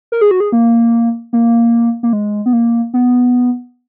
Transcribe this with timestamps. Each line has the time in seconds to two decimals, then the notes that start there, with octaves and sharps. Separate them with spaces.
0.12 A#4
0.21 G#4
0.31 F#4
0.40 G#4
0.52 A#3
1.33 A#3
2.03 A#3
2.13 G#3
2.46 B3
2.53 A#3
2.94 B3